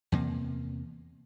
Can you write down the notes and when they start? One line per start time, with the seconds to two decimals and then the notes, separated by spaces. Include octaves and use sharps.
0.12 E2 C3 A#3